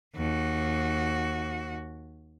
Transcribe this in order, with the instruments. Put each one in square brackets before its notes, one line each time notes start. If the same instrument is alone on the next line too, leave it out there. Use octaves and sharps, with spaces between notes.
[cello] D#2 F#4